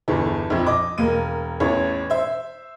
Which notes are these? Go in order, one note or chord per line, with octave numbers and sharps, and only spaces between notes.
G1 E2 A4
A#1 F2
D#5 D6
E1 A#3 D#7
A1 E2 C#5
C5 E5